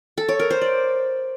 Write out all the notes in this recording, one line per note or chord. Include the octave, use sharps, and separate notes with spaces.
A4
C#5
A#4
C5
D5